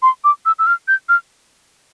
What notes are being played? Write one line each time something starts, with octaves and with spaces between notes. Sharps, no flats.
C6
D6
E6
E6
F6
G6
F6